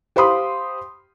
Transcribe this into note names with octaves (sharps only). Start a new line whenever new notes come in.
G4 C5 F5 B5 C6 D#6